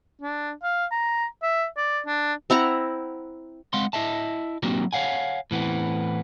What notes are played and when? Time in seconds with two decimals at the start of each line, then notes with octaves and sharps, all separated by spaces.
0.22 D4
0.63 F5
0.92 A#5
1.43 E5
1.77 D5
2.06 D4
2.50 C4 E4 F#5 A#5
3.73 G#3 C4 F5 F#5 C6
3.93 E4 D#5 E5 A5
4.63 F#3 A#3 C4 D4 F#4 G4
4.93 C#5 F5 F#5 G#5
5.51 A2 E3 B3 C4